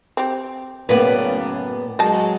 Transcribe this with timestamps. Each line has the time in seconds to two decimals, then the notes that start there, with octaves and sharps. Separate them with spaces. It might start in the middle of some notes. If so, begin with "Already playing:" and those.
0.17 C4 G4
0.89 F#2 A2 C#3 A#3 B3 B4 D5
1.99 F#3 G#3 D#5 A5